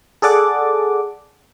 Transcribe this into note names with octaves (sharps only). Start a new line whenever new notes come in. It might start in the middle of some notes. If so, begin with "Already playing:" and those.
G#4 A4 D5 F#5 D6